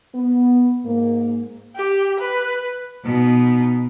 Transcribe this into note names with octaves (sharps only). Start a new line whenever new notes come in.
B3
G#2 A#3
G4
B4
B2 D#4